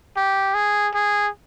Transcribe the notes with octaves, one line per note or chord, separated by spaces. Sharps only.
G4
G#4
G#4